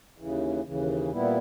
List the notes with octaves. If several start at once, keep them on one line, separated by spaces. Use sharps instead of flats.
D#2 C#3 E3
D#2 C#3 E3
A#2 G3 B3 E4